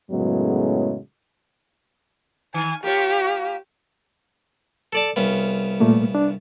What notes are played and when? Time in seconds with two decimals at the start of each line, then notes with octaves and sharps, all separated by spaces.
0.11 F#2 A2 C#3 F#3 G#3 B3
2.54 D#3 G#5
2.84 A#3 F4 G4 C#5
4.93 A4 D5 A5
5.16 C2 C#3 B3
5.80 A#2 A3 A#3
6.15 D4